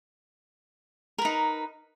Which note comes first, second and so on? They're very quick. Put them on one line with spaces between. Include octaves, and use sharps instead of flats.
A#4 B4 D#4